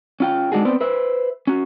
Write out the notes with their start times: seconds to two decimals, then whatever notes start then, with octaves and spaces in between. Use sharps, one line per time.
0.20 C#4 F4 G5
0.52 G#3 D4 D#4 F#4 G#4
0.65 B3 C4 C5 D5
0.81 B4 C5 E5
1.47 C#4 F#4